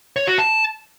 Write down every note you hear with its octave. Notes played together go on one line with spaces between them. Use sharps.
C#5
F#4
A5